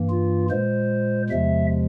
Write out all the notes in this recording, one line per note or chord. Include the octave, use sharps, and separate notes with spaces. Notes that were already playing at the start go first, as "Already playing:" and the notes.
Already playing: G2 E3 A#3
F4
A#2 G#3 C5
E2 C3 F3 G#3 E5